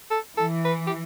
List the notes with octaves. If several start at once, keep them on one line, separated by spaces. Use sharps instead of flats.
A4
E3 A4
B4
G4